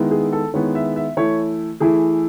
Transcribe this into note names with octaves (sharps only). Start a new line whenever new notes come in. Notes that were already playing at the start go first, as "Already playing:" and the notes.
Already playing: D#3 G#3 B3 E4
G#4
A4
D#3 G#3 B3 E4 C#5
E5
E5
E3 A3 E4 C#5
E3 A3 E4 G#4